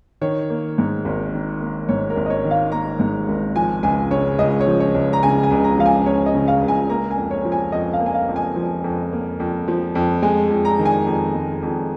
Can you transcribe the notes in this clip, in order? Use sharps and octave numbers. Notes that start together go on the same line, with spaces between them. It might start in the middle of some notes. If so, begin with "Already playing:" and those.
D#3 C#5
A#3
G#2
G#1
D#3
A#3
G#2 C#5
A#4
G#1
D#5
C#5
D#3
F5
A#3 A#5
G#2
G#1
F3 G#5
C#2 G#5
C#3 C#5
C#2 D#5
C#5
F3
C#5
C#2
A#5
C#3 G#5
G#5
C#2
A#5
F3 F5
G#5
C#2 C#5
D#5
C#3
F5
C#2
G#5
A#3 A#5
G#5
F2
C#5
F3
G#5
F2 D#5
F5
A#3
G#5
F5
F2
G#5
F3
F2
A#3
F2
F3
F2
G#3 G#5
F2
A#5
D#3
G#5
F2
G#3
F2